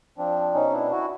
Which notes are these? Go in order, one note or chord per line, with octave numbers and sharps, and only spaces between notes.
F3 C4 D4
B2 C#4 D#4
D4 E4
E4 F#4